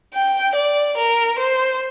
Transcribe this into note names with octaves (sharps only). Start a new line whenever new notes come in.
G5
D5
A#4
C5